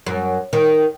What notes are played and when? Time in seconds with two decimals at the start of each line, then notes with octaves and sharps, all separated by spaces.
0.06 F#2
0.53 D#3